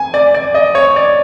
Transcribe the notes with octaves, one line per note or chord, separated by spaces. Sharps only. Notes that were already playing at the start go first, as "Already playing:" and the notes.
Already playing: G#5
D5
D5
D#5
C#5
D5